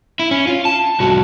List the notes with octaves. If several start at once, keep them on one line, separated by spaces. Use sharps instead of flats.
E4
C#4
F4
A5
C2 F#4